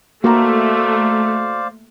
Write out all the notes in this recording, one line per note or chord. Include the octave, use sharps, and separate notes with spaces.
A3 A#3 F#4 A#4 C5 D5 F5 A#5